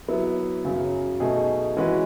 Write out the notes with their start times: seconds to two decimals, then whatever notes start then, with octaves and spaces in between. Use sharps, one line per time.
0.08 F#3 B3 E4
0.64 F#2 C#3 F#3
1.20 B2 A3 D#4 G#4
1.77 E3 G#3 C#4 F#4 B4